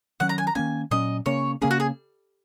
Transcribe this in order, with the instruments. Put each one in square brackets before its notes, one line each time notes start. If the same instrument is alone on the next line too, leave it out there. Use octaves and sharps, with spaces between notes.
[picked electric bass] D#3 F#3 C#4 [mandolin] F#5
[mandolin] A#5
G#5
A#5
[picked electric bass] D#3 A#3 C#4 [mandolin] G#5
[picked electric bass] A#2 F#3 C#4 [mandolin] D#5
[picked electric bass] C#3 A#3 C#4 [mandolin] C#5
[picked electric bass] C#3 A#3 C#4 [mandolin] G#4
[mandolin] F#4
G#4